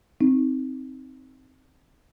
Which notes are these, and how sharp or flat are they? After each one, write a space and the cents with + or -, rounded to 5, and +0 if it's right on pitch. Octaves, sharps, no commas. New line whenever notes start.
C4 +0 D#4 +0